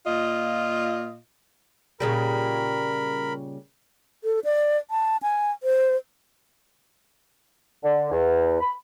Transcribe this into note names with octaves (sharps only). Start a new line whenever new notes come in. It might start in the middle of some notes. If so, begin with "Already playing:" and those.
A#2 F4 D#5
A#2 C#3 G3 A#4 B5
A4
D5
A5
G#5
C5
D3
E2
B5